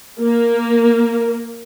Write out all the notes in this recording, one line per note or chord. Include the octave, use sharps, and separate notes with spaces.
A#3